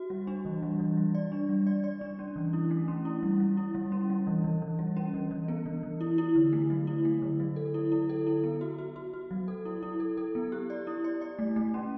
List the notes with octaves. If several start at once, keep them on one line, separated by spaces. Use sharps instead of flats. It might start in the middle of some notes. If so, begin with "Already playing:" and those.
Already playing: F#4
G3
D4
E3
G3
E3
G3
D5
D4
G3
D5
D5
D4
C#4
E3
E4
A3
C#4
E4
G3
G3
E4
G3
C#4
G3
E3
E3
E3
G3
C#4
E3
E3
B3
E3
E3
E4
E4
D3
A3
F#3
E4
A3
D3
F#3
A4
E4
E4
A4
E4
B3
F#4
F#4
F#4
F#4
F#3
A4
E4
E4
A4
A4
B3
G4
D5
E4
D5
D5
A3
A3
C#4